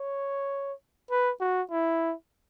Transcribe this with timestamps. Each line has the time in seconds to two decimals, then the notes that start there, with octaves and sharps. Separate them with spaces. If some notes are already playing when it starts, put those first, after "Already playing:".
Already playing: C#5
1.10 B4
1.41 F#4
1.71 E4